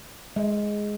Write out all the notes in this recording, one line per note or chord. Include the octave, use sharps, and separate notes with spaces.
G#3